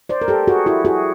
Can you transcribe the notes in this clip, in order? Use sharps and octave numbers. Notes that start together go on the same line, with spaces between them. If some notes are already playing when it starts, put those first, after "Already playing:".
C5 D5
A#4
G4 A4
F#4 G#4
E4 F#4
F#4 G#4